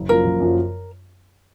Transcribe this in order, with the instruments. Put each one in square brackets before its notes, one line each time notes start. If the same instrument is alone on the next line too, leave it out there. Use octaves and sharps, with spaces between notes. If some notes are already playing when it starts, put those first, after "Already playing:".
Already playing: [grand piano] F#1
[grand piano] F#2 F3 A#3 F4 [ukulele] A#4
[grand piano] F#1
F#2 F3 A#3 F4